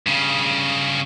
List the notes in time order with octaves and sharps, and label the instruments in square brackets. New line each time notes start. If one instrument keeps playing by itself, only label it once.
[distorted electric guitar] G2 C#3